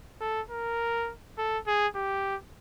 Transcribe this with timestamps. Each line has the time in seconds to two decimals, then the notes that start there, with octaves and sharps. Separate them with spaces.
0.21 A4
0.51 A#4
1.38 A4
1.67 G#4
1.95 G4